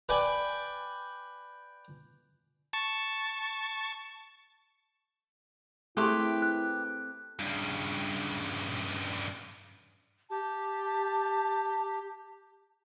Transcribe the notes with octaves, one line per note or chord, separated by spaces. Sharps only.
B4 D5 G5 G#5 B5
A5 C#6
A3 C4 E4 G4 G#4 B4 G5
F#6
G2 C#3
G4 A5